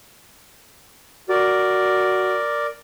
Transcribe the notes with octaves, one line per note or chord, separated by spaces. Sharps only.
F#4 A#4 D5